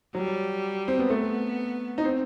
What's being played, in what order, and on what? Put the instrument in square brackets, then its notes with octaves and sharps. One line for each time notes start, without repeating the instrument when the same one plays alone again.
[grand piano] F#3 [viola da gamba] G3
[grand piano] C4
B3
[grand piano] A3 [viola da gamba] B3
[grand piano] D#4
C4